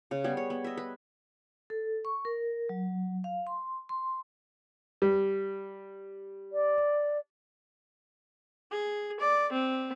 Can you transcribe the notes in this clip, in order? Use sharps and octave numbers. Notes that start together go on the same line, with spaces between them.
C#3
G3 B3 G#4
C#5
B3
D#5 E5
B4
A4
C#6
A#4
F#3
F5
C6
C6
G3
D5
G#4
D5
C4